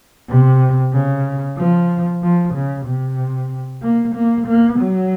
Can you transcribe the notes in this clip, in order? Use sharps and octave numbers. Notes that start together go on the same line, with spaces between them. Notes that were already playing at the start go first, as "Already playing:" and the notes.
C3
C#3
F3
F3
C#3
C3
A#3
A#3
A#3
F#3